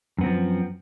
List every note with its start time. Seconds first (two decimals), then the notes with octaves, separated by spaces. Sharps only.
0.18 F#2
0.21 B3
0.24 C4
0.26 F3